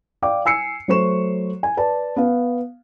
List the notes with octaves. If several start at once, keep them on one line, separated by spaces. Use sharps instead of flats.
D5 F5 G5 D6
G#5 E6 C7 C#7
F#3 A3 C5 C#6 E7
G#5
B4 D5 A5
B3 F5